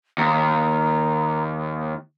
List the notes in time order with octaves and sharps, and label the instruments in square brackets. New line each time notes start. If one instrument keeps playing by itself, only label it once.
[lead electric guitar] D#2 [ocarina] A#5